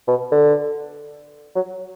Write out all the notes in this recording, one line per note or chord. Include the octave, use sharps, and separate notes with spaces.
B2
D3
F#3